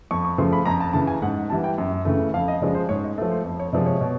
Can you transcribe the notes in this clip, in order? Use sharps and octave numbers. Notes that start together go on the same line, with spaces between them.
F2 C#6
C#6
C#3 F3 A3 C6
B5
F2 A#5
A5
C#3 E3 A5
G#5
G#2 F#5
E3 G3 A5
G5
F#2
C#3 E3 A3
F2 F5
D#5
C#3 F3 G#3 D5
C5
G#2 C#5
D#5
F3 A3
C5
F2
C#5
C3 F3 G#3 D5
C#5
B2